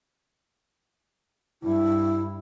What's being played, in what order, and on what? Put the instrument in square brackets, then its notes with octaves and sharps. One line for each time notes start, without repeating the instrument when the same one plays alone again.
[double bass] G2 [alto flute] E4